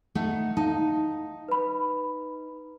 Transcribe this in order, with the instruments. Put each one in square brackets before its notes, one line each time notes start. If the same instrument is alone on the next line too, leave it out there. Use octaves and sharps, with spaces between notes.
[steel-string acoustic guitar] A3 D#4 F#5
[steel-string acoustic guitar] D#4 [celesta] F5 A5
[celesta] B4 B5